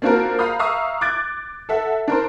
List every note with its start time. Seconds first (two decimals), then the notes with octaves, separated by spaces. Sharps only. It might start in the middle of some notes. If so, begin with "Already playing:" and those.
0.02 A#3 C4 D4 F4 F#4 A#4
0.39 F5 A#5 B5 D#6 G6
0.59 E5 F5 A#5 C#6 D#6 E6
1.01 D6 F#6 G#6 A6 D7
1.69 A4 E5 F#5
2.08 D4 A#4 C5